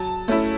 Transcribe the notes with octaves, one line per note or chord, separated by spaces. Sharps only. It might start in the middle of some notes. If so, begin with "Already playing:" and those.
Already playing: F#3 A5
A3 C#4 E4